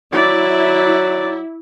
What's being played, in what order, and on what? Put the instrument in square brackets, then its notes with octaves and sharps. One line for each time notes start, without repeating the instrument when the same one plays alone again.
[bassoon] F#3 [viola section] E4 [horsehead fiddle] D5